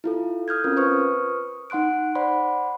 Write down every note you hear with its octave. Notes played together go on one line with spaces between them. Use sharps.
E4 F4 A4
D#6 F6 G6 G#6
C4 C#4 F4 A#4
B4 C5 C#6 D#6 F6
D#4 F#5 C6 F#6 D7
C5 D5 F#5 B5 C6